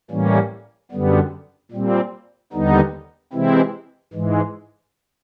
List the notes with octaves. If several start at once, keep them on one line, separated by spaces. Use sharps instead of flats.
A2 E3 G3 A#3 C#4
F#2 D3 G3 B3
A#2 G3 C4
D#2 D3 G3 B3 D#4
C3 E3 G#3 C4 E4
G#2 E3 G#3